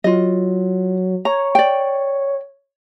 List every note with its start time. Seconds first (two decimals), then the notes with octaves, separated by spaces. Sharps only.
0.04 F#3 F4 D#5
1.25 C#5 A#5
1.55 D5 G5